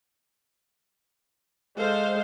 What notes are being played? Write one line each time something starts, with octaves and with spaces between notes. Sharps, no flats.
G#3 A4 C5 F5